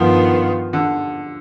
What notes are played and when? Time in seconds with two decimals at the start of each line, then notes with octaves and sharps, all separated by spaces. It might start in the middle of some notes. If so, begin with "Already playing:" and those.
Already playing: G2 D#3 F3 B3 F4
0.73 D3